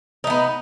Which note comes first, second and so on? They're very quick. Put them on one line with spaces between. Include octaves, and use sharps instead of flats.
D#4 A3 B3